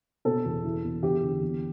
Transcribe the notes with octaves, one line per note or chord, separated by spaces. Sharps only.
B2 A4
E2
E3
E2
E2 G4
D3
E2